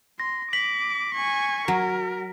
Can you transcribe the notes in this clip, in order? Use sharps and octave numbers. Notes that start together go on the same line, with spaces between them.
C6 A#6
D6 B6 F#7
G#5 C#6
F#3 A#4